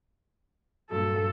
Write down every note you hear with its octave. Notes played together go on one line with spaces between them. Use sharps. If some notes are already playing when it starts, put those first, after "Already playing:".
G2 A#2 F#3 A4